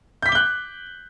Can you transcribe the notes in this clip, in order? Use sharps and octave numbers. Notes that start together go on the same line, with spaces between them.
D6 F#6 G6 B6 G7